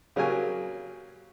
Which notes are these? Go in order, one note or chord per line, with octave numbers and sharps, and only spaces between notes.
C#3 F#3 A#3 G4 G#5